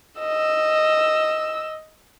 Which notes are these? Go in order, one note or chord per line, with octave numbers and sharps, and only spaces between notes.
D#5 E6